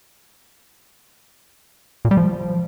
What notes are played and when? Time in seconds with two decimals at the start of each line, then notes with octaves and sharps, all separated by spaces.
2.05 A#2
2.11 G3
2.17 F3